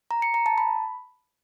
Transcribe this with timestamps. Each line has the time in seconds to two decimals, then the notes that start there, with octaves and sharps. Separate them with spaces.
0.11 A#5
0.22 C#7
0.34 A#5
0.46 A5
0.58 B5